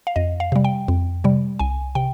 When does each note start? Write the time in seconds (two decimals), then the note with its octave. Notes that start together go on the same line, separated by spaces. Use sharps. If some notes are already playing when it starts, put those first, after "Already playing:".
0.07 F5
0.16 F2 D#5
0.40 F5
0.52 C3 G3
0.64 G5
0.88 F2
1.24 C3 G3
1.59 C2 G#5
1.95 C3 G5